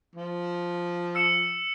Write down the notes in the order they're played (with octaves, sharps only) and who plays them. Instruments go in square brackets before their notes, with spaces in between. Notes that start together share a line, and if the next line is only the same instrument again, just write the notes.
[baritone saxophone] F3
[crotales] E6 C#7 E7